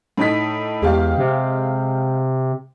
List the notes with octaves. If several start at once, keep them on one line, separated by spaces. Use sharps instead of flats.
A2 D#4 B6
E2 G#3 G4 F5
C3